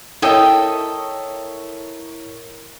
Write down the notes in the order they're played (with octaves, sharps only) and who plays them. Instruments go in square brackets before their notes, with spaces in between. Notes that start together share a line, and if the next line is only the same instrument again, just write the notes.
[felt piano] E4 A#4 C#5 [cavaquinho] A4 D#5 G5